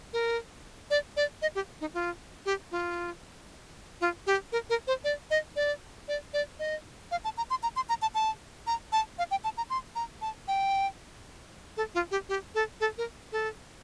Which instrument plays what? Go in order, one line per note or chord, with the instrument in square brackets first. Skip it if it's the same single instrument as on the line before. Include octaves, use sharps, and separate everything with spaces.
[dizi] A#4
D5
D5
D#5
G4
D#4
F4
G4
F4
F4
G4
A#4
A#4
C5
D5
D#5
D5
D5
D5
D#5
F5
A5
A#5
C6
A#5
C6
A#5
A5
A5
A#5
A5
F5
G5
A5
A#5
C6
A#5
A5
G5
A4
F4
G4
G4
A4
A4
A#4
A4